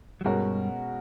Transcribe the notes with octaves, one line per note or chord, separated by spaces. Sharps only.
F#3
G2 B2 G3 G#3 C#4 F#4 A#4